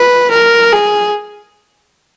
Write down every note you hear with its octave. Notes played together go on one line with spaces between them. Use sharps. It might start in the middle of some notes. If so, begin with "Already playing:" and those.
Already playing: B4
A#4
G#4